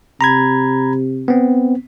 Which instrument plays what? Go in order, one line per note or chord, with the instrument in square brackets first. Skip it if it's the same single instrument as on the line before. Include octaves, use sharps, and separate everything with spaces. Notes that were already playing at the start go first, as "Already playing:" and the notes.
[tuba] C3 [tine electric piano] A#5 B5 G#6
[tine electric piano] B3 C4